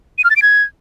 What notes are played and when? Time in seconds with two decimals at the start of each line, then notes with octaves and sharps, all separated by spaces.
0.18 D#7
0.24 F6
0.30 A6
0.36 D7
0.42 G#6